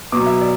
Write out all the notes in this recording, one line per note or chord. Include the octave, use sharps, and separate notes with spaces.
B2 F#3 D6
E5
D5